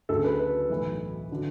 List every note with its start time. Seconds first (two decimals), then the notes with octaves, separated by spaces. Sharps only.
0.09 D2 C#3 F#3 A4
0.24 B4
0.39 B4
0.70 B1 A2 E3
1.32 D3 F#3